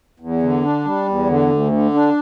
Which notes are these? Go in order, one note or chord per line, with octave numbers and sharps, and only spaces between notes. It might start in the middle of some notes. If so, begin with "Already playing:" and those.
E2
D3
D4
G3
E2
D3
D2
D3
D4